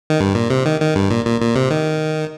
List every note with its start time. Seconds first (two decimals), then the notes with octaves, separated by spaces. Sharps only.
0.10 D#3
0.20 G2
0.35 A#2
0.50 C3
0.66 D#3
0.80 D#3
0.95 G2
1.11 A#2
1.25 A#2
1.41 A#2
1.56 C3
1.71 D#3